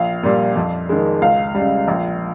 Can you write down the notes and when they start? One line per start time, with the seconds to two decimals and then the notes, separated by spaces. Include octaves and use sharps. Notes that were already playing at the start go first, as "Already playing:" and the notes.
Already playing: A#1 F5
0.23 A#2 G3
0.56 F2
0.89 D#3 G#3
1.22 C#2 F5
1.55 C#3 G3
1.88 A#1